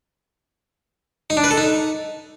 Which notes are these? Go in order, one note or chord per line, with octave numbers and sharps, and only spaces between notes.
D#4
D4
B4
A4
D#4